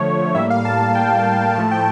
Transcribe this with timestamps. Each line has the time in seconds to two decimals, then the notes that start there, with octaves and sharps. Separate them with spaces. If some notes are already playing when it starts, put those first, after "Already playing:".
Already playing: D3 F3 A3 C#5
0.35 A2 G3 A#3 E5
0.50 F5
0.65 A5
0.95 G5
1.55 A2 F3 A3 A5
1.71 G5